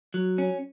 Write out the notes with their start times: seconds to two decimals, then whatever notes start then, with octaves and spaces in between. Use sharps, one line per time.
0.14 F#3
0.38 C#4